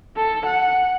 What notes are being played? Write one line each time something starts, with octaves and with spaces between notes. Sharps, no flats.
A4
F#5